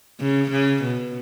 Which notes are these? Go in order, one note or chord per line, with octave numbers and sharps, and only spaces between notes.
C#3
C#3
B2